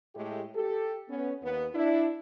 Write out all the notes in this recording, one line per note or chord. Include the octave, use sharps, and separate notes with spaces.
A2 G#3 A3 G4
G4 A4
B3 C#4
D#2 B3
D4 E4